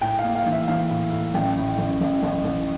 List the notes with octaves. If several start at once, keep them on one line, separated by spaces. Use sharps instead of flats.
A2 G5
F5
A#3
F5
E3
E5
E3 F5
A2
A2
A1 G5
A2
A1
A1
A1
A1